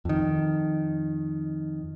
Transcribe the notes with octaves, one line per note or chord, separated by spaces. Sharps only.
F2 D#3